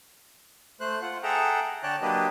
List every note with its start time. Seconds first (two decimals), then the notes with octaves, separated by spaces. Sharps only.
0.81 A3 C5 F#6
1.02 F4 F#5
1.23 G#4 A4 E5 F#5 G5 A#5
1.83 D3 C#5 D5 G5 A5 F#6
2.02 F#3 A#3 D4 G4 B4 D#5